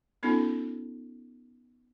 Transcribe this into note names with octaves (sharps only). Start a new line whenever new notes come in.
B3 C#4 D#4 F4 A4